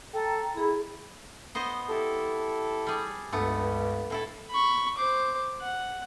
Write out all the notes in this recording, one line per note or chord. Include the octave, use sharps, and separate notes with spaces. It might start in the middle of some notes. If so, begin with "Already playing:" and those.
A4 G5 A#5
E4 G#4 B5
B3 C5 D#5
E4 G4 A4
G3 G#4
C#2 G2 A3 B3
A2 E4 A4
B5 C#6
C5 D6
F#5